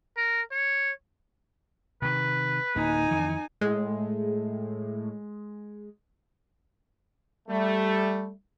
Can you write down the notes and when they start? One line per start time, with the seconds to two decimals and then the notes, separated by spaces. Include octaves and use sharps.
0.17 A#4
0.52 C#5
2.02 C3 D#3 B4
2.76 D1 A#3 D#4 G#5
3.11 F2 D#3 E3
3.61 A2 G#3
7.49 G3 A3